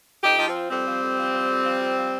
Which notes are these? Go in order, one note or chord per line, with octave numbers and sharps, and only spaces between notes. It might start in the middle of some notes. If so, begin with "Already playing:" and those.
F2 D#4 G4
F3 D#4
C4 F4
F3
F2 G3 C4
F3
F2
F3
F3
F2
F3
F2
F3